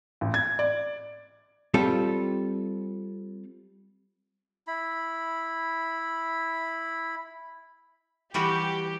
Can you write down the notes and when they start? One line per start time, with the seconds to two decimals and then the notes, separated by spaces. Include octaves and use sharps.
0.21 A1
0.34 G#6
0.59 D5
1.74 G3 C4 F4 A4
4.67 E4 B5
8.34 E3 G3 F#4 G4